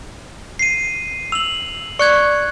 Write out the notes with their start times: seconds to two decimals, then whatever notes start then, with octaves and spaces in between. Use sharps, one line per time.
0.59 C7 D#7
1.32 E6 F7 F#7
1.99 D5 C#6 F#6 G#6 C#7